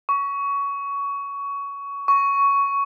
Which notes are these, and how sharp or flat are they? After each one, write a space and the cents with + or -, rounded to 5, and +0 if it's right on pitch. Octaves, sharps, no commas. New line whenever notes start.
C#6 +20
C#6 +10